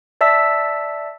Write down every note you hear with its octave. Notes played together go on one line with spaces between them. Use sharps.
D5 E5 A5 E6 B6